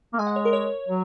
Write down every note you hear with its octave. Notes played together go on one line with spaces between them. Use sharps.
A#3
G#3 G#5
F#5
C#5
A#4
C#5
F#3